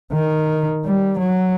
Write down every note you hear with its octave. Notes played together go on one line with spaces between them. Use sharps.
D#3
G3
F#3